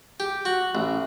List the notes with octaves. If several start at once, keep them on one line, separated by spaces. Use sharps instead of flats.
G4
F#4
A1